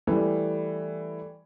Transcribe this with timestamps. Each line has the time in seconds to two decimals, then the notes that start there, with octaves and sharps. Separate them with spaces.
0.07 E3 G3 A3